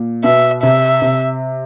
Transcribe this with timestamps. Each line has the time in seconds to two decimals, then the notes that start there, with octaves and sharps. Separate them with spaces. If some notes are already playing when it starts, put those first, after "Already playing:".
Already playing: A#2
0.24 B2 E5
0.63 C3 E5
1.02 C3